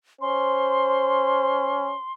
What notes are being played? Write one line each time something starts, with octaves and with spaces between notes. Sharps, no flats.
C#4 C5 C6